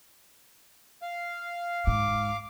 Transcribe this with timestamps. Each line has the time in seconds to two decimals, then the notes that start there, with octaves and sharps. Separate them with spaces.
1.02 F5
1.87 G#2 D6